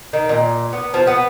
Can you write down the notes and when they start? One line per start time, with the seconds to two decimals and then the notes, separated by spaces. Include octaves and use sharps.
0.13 D#3
0.29 A#2
0.73 B3
0.94 F3
1.07 B3